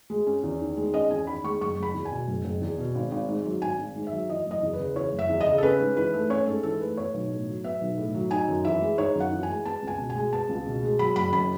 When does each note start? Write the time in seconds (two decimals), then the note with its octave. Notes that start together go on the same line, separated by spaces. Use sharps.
0.10 G#3
0.27 C#4
0.43 E2
0.60 D#3
0.77 G#3
0.94 C#4 D#5
1.10 E2 G#5
1.27 D#3 B5
1.44 G#3 C#6
1.61 F#1 C#6
1.77 F#1
1.83 B5
1.95 E2
2.05 G#5
2.11 B2
2.28 F#1
2.44 F#1
2.62 E2
2.78 B2
2.95 G#1
3.12 G#1
3.28 G#2
3.45 F#3
3.62 G#1 G#5
3.79 G#1
3.96 G#2
4.07 E5
4.13 F#3
4.29 E3 D#5
4.46 F#1 D#5
4.63 E2
4.73 B4
4.79 C#3
4.96 E3 C#5
5.12 F#1
5.19 E5
5.29 E2
5.41 D#5
5.46 C#3
5.58 A4
5.63 C#4 B4
5.80 G#2
5.97 E3 B4
6.14 A3
6.30 C#4 C#5
6.47 G#2 A4
6.63 E3 A4
6.80 A3 B4
6.97 B3 C#5
7.14 B1
7.30 A2
7.48 F#3
7.64 B3 E5
7.81 B1
7.98 A2
8.15 F#3
8.31 D#4 G#5
8.48 F#2
8.65 E3 E5
8.82 G#3
8.98 D#4 C#5
9.15 F#2
9.20 F#5
9.31 E3
9.43 G#5
9.49 G#3
9.65 B3 A5
9.82 C#2
9.87 G#5
9.98 B2
10.10 G#5
10.15 G#3
10.32 B3 A5
10.49 C#2
10.66 B2
10.83 G#3
10.99 F#3 B5
11.16 F#1 B5
11.32 F#2 B5